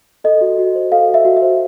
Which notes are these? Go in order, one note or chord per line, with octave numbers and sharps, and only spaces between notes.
A4 D#5
F#4
F#4
C5
A4 F5
F#4
E5
F#4
E5
C5